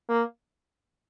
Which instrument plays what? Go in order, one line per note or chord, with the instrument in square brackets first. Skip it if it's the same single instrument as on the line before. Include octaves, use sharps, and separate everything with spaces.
[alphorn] A#3